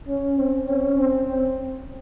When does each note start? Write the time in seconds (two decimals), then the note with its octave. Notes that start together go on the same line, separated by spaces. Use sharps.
0.09 C#4
0.39 C4
0.69 C#4
0.98 C4